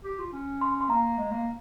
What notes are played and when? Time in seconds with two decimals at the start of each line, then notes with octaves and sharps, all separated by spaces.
0.04 G4
0.19 F4
0.33 C#4
0.61 C6
0.81 C6
0.89 A#3 A#5
1.18 G#3
1.31 A#3